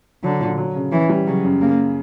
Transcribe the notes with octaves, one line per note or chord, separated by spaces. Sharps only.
D3 F#3
A#2
F#3
C#3
E3 C#4
G3
C#3 F#3
F#2
C#3 A#3